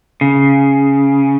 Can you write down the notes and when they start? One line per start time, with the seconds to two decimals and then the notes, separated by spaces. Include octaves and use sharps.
0.21 C#3